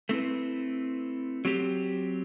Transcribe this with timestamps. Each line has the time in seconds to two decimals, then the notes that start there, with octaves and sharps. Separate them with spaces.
0.09 A3 C4 E4 B4
1.45 F#3 C4 G4